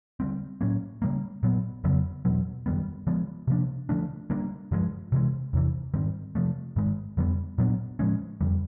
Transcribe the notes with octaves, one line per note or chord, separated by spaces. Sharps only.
D3 G3 C4
A2 F#3 A#3 C#4
C#3 E3 G3 A#3
A#2 F#3 B3
F2 C#3 F#3 B3
E2 B2 F#3
F#2 D#3 G3 B3
D3 F3 G#3 B3
C3 F3 A#3 D4
D3 F3 A3 D4
D3 G3 A#3 D4
G2 D3 F3 G#3
C3 E3 G#3
E2 C3 E3
G#2 D#3 G3 C4
C3 F3 A3
G#2 D#3 G#3
F2 D3 G3 B3
A#2 F#3 B3 D4
A2 F3 G#3 C#4
F2 D3 G3